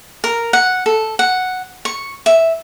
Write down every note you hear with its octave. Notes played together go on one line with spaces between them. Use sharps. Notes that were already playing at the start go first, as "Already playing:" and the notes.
A#4
F#5
A4
F#5
C#6
E5